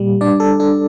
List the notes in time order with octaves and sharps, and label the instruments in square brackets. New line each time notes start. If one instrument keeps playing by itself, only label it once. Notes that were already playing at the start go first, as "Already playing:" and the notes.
Already playing: [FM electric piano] A#2 G3
D4 D5
A4
D4 A4